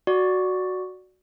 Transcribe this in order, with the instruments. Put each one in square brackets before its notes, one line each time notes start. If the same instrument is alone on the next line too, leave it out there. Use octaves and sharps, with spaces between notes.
[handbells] F#4 D5